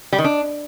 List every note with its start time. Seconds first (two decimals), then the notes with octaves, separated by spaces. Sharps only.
0.13 G3
0.18 D#3
0.24 D4